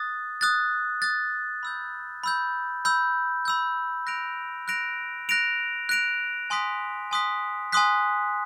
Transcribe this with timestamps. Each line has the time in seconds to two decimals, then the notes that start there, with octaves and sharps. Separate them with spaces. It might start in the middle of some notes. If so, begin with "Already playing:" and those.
Already playing: D#6 F#6 A6
0.41 D#6 F#6 A6
1.02 D#6 F#6 A6
1.63 B5 E6 G6
2.24 B5 E6 G6
2.85 B5 E6 G6
3.45 B5 E6 G6
4.07 F#6 A#6 D7 F7
4.68 F#6 A#6 D7 F7
5.29 F#6 A#6 D7 F7
5.89 F#6 A#6 D7 F7
6.50 G#5 C6 D#6 F#6 B6
7.11 G#5 C6 D#6 F#6 B6
7.72 G#5 C6 D#6 F#6 B6